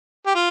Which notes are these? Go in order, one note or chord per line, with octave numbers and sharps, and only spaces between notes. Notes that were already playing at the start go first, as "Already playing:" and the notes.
G4
F4